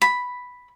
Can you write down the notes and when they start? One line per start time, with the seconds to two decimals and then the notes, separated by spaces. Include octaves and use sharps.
0.02 B5